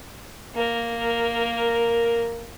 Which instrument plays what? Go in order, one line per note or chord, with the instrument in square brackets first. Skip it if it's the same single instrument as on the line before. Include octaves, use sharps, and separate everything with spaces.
[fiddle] A#3 A#4